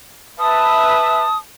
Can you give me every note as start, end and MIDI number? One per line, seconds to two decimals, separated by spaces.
0.39 1.26 71
0.39 1.26 76
0.39 1.31 81
0.39 1.38 87